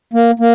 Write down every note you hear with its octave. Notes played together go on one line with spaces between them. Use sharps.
A#3
A#3